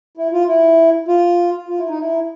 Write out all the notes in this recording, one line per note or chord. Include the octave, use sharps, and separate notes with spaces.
E4
F4
E4
F4
F4
E4
D#4
E4